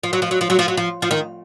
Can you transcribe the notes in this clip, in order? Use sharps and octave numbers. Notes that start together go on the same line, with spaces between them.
F3
F#3
F3
F#3
F3
F#3
F3
F#3
F3
F3
D#3